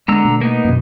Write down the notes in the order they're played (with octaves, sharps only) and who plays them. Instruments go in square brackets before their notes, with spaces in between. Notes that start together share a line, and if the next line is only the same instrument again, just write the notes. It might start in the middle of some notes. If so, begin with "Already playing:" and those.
[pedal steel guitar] D3 A#5 E6 [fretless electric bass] G#3 B3
[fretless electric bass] B2 A3
[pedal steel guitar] A#3 B3 D#4
[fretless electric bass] F#2 B2